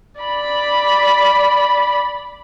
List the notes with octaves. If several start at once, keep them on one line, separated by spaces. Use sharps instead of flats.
D5 B5